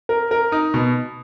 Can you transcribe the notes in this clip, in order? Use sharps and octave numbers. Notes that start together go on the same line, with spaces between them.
A#4
A#4
D#4
B2